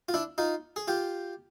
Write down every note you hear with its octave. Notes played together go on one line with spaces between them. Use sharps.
F4
D4 E4
D#4 F4
G#4
F4 G4